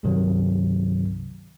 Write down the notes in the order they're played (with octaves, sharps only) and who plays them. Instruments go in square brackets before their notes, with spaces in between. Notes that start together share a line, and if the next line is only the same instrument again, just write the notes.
[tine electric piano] C2 G2 C3 D#3 F#3